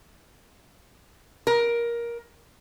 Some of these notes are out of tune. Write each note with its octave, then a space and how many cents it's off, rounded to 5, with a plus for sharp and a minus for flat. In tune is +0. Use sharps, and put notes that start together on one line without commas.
A#4 +15